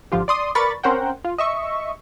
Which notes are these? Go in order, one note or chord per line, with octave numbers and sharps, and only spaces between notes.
G#1 D3 F3 F4 G4
D5 C6 D#6
A#4 B4 D5 B5 C#6 A6
C4 C#4 A#4 C5 F#5 G5
F4
D#5 E5 C#6